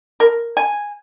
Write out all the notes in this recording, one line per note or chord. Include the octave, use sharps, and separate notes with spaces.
A#4
G#5